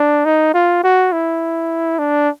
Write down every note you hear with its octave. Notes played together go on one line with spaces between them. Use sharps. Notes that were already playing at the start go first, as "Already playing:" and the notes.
Already playing: D4
D#4
F4
F#4
E4
D4